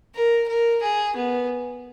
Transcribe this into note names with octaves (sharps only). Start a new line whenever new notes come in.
A#4
A#4
G#4
B3